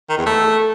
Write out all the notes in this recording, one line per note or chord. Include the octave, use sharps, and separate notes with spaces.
D#3
E2
A3